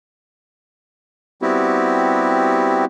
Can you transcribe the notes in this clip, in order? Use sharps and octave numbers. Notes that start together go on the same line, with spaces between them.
G3 B3 C4 E4 F#4 G4